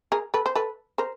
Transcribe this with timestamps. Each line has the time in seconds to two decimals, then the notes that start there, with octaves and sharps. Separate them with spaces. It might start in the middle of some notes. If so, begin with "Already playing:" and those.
0.12 G#4 A#4
0.34 A4 B4
0.46 C5
0.55 A4 B4
0.98 A#4 C5